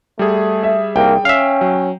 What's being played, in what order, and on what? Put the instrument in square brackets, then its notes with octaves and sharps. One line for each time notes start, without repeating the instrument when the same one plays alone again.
[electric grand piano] G3 G#4 [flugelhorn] A3
[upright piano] E5
[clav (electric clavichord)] C2 [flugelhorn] A#3 [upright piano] G5
[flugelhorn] C#4 [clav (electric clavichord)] E5 F5
[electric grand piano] F#3